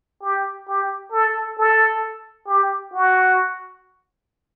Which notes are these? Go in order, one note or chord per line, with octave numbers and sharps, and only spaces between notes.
G4
G4
A4
A4
G4
F#4